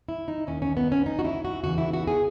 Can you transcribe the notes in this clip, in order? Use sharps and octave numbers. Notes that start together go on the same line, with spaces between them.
E4
D#4
D#2 D#3 C#4
C#4
B3
C#4
D#4
F#4
E4
F#4
E2 C#3 E3 F#4
E4
F#4
G#4